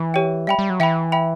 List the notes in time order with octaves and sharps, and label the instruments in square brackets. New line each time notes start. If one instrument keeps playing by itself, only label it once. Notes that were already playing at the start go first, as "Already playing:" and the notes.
Already playing: [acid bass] E3
[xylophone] G4 C#5 G5
[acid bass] G3 [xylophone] E5 G5 B5
[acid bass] G3
F#3
[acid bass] E3 [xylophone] E5 G5 B5
[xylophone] E5 G5 B5